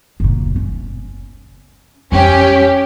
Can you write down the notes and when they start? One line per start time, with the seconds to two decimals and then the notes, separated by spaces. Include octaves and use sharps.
0.20 F#1 A#2
0.56 C#4
2.12 F2 G3 C#4 G4